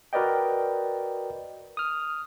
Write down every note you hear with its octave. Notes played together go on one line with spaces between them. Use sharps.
F#4 A#4 B4 D5 D#5 G5
D#6 F6